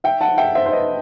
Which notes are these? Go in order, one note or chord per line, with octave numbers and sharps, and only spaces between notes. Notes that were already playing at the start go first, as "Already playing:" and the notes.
E5 G5
F#5 A5
E5 G5
C5 E5
C5
B4 D#5